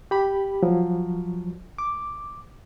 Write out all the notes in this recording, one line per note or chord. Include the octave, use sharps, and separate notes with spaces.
G4 B5
F3 F#3
D6